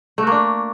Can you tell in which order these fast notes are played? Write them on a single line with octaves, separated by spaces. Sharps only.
A3 F#4 A#3 D4